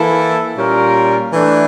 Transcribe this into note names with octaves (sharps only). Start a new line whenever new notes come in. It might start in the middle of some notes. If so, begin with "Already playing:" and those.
Already playing: E3 A#3 E4 A4
A#2 G3 C#4 F4 A#4
E3 A3 D4